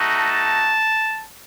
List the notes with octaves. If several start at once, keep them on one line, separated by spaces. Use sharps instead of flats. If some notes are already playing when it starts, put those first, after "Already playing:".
Already playing: A3 D#4 F#4
A5